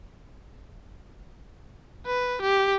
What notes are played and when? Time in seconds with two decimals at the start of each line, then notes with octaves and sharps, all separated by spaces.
2.07 B4
2.41 G4